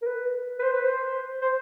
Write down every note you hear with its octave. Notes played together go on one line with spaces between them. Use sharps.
A#4
B4
B4
C5
B4
C5
C5